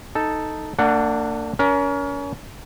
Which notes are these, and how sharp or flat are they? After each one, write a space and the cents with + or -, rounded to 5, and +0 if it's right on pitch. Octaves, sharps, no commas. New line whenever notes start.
D#4 +0 A4 +0
A#3 -45 D4 +0 F#5 +0
C#4 +30 A#4 +20